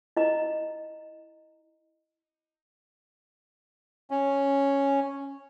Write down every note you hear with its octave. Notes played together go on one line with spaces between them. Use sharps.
E4 D#5 A#5
C#4